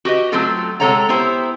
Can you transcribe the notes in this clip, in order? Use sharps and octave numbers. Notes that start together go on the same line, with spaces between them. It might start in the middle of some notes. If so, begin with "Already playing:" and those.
F#4 G4 B4 D#5
F#3 A3 C4 F4 F#4 A4
C3 G#3 A4 C#5 F#5 A#5
B3 E4 G4 C5